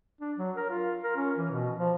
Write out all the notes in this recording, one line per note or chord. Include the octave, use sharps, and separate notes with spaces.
D4
F#3
A#4
F4
A#4
C#4
E3
B2
F3